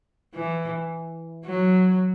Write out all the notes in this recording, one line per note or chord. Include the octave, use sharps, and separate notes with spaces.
E3
F#3